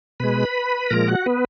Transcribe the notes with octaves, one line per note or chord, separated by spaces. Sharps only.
B2 G#3 B4 B5
A#2 F3 G#3 A#4 A#5
F#4 F#5
B3 B4